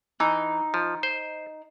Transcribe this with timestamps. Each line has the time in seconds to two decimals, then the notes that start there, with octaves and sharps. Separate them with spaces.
0.20 E3 D#4
0.74 F3
1.03 C5